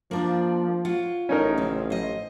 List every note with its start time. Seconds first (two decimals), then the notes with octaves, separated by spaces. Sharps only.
0.11 F3 A#3 D4 D5
0.85 F4 C#5 F#5
1.29 A1 C#4 D#4 A#4
1.58 C#3 C4
1.90 C5 D#5